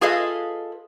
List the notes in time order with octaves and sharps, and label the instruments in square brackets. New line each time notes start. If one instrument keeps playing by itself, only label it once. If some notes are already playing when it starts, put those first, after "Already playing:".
[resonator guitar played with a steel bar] F4 G#4 A4 B4 D#5 F5